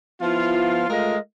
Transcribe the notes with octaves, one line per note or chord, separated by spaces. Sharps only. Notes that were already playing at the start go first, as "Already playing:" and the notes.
F3 B3 E4 F4
G#3 A3 F4 A#4 D#5 F5